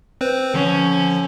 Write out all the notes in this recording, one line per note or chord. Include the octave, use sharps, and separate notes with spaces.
C4 B4 C5
D3 F3 C#4